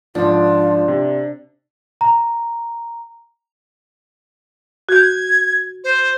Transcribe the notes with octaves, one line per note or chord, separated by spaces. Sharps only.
G#2 F3 D4 F4
C3
A#5
F#4 G6 G#6
C5